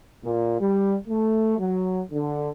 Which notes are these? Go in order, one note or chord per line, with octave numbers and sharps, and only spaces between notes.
A#2
G3
A3
F#3
D3